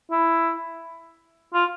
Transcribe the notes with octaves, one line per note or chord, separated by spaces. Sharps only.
E4
F4